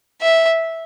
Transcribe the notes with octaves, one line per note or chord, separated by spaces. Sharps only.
E5